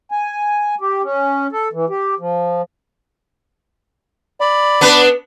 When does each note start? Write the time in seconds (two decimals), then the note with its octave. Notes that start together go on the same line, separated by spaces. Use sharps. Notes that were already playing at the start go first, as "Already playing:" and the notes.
0.11 G#5
0.81 G4
1.03 C#4
1.52 A4
1.73 E3
1.90 G4
2.20 F3
4.40 D5 B5
4.81 B3 D4 B4